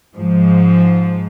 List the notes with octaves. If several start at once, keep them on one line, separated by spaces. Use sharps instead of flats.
G#2 F3